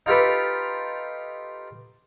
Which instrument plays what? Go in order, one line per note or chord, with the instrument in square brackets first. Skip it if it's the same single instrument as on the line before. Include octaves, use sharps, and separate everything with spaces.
[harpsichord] D#4 F4 G4 A4 B4